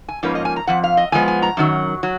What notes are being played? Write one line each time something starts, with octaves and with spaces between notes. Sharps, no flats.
G#5
G#2 F3 A#3 C#4 B4
D#5
G#5
A#5
F2 F3 F#5
F5
D#5
F2 F3 G#3 B3 G#5
G#5
A#5
F#2 D#3 F#3
F#3